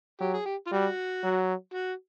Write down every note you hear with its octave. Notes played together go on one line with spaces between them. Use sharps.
F#3 G4
G#4
G4
F4
G3 F#4
F#3
F#4